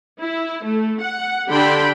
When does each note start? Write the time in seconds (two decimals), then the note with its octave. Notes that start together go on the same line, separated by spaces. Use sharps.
0.19 E4
0.63 A3
1.01 F#5
1.49 D3 D4 G4 G5 B5 C6